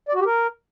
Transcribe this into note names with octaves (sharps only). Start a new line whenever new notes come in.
D5
F#4
G4
A#4